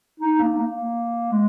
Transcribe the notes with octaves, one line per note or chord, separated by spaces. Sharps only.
D#4
A#3
A#3
G#3